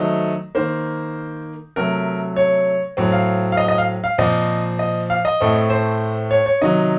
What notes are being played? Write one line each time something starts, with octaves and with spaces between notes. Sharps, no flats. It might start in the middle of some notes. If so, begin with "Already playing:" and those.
Already playing: D#3 F#3 A3 C4 D#5
D#3 A#3 C5
C3 F#3 A3 A#4
C#5
A2 F#3 C4
F5
F5
D#5
D#5
F5
F5
A#2 F3 C4 D#5
D#5
F5
D#5
A2 A3 C4
C5
C#5
C#5
C3 D#3 F#3 D#5